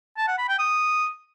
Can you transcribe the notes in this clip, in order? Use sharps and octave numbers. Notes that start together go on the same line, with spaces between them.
A5
F#5
B5
G5
D#6